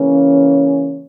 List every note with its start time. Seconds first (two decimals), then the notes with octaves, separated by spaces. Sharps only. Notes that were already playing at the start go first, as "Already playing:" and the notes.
Already playing: C#3 E3 A#3 C#4